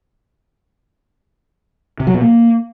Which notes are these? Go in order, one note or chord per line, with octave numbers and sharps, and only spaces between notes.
C3
F#3
B2
A#3